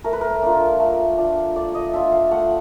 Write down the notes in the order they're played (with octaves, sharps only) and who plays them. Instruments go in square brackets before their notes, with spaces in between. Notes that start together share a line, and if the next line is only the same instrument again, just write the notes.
[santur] A3 A#4
B4
A#4
D4 F4
A3
D4 F4
A3 D5
D#5
D4 F4 E5
F5
A3 F#5